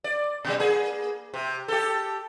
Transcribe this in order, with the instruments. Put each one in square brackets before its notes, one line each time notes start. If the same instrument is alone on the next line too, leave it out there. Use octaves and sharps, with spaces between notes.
[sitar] D5
B2 D3 G3
A#3 G#4
C3
G4 A4